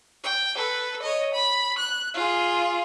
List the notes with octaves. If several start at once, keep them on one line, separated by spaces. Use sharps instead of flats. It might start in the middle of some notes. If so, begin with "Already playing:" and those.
G5
A4 B4
C#5 D#5
B5
F#6
F4 G#4